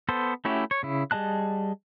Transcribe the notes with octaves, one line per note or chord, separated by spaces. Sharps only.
B3 A4 C5
A3 C#4 E4 F#4 G4
C#5
C#3 E4
G3 G#4 D#5 A5 F#6